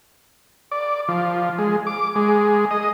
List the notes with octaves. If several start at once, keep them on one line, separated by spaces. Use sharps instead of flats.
D5
F3
G#3
D6
G#3
D#5